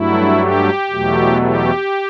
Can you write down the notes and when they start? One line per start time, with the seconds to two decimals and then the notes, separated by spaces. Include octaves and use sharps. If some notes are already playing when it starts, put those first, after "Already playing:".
Already playing: G2 F#3 A3 E4
0.40 G4
0.90 E2 B2 F#3 A3
1.41 G4